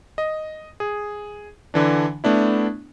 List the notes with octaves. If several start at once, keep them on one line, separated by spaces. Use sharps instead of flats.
D#5
G#4
D3 E3 D4
A3 B3 D4 E4